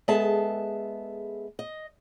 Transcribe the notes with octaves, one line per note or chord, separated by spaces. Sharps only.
G#3 B3 G#4 A4 E5 A5
D#5